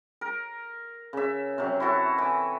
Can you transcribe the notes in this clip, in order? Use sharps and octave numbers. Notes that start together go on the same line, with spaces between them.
A#4
C#3 E5
C3 F#3
E4 F#4 A4
E3